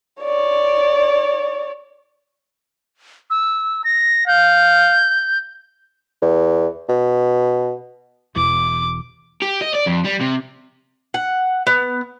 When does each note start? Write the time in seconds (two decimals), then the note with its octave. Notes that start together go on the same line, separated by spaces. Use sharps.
0.22 C#5 D5
3.30 E6
3.84 A#6
4.28 F5 G6
6.22 E2
6.89 B2
8.36 E1 E2 E3 D6
9.42 G4
9.61 D#5
9.74 D5
9.86 F2
10.04 G3
10.20 C3
11.14 F#5
11.67 B3